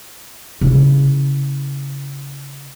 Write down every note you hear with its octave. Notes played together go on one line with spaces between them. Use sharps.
C#3 E4